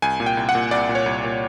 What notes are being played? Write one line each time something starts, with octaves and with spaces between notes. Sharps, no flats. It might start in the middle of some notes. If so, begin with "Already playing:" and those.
C2 G#5
A#2
G5
C2
F#5
A#2
C2 D5
A#2
C#5
C2
A#2